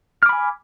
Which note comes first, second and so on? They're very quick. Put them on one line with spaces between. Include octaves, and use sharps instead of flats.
F6 D6 B5 G#5